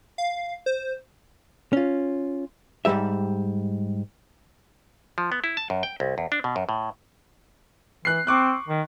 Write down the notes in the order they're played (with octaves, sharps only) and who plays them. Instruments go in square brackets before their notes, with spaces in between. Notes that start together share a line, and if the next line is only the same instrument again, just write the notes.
[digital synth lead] F5
C5
[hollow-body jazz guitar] C#4 F4
G#2 D#3 G3 G4 E5
[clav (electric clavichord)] F3
B3
E4
A5
F#2
G5
C2
E2
D4
B2
F#2
A2
[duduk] E3 [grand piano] F#6 C7
[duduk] C4 [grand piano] C#6 D6 F#6
[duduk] D#3